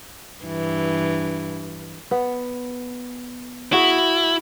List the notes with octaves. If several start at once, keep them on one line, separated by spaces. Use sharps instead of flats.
G2 E3
B3
E4 F#4 G#4